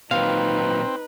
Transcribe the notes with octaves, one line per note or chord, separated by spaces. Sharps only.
A#2 D#3 F#3 C4 D#4 B4 F5